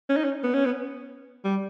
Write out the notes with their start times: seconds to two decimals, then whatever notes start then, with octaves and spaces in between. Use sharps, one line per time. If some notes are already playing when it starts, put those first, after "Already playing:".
0.09 C#4
0.17 D#4
0.24 C#4
0.44 B3
0.54 C#4
0.66 B3
1.45 G3